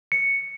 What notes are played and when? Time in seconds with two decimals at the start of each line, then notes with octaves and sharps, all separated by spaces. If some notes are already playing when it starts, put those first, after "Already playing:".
0.12 C#7